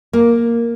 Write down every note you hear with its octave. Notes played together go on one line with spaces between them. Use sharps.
A#3